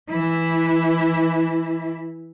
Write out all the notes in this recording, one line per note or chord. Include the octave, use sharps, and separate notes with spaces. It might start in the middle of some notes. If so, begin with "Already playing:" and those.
E3 E4